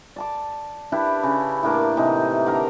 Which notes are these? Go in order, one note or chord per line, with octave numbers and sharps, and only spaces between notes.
D5 A5 D6
D4 E4 G4 B4
C#3
A2 A#3 D4 D6
C3 E3 D#4
D3 A#4 A#5